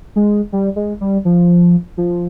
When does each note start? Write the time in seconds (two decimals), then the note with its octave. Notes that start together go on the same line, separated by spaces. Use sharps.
0.16 G#3
0.52 G3
0.76 G#3
1.01 G3
1.25 F3
1.97 F3